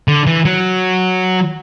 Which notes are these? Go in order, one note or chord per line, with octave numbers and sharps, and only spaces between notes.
D3
E3
F#3